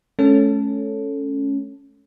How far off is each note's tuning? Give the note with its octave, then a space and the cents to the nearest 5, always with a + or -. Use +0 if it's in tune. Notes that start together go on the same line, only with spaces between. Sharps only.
A3 -40 C#4 +0 A4 +0